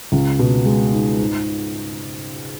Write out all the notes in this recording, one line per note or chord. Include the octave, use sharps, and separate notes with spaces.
C#2
B2
G#3
D#4
G#2